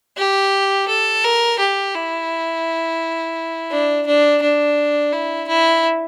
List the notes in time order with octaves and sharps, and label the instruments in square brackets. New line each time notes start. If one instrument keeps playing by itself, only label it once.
[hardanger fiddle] G4
A4
A#4
G4
E4
D4
D4
D4
E4
E4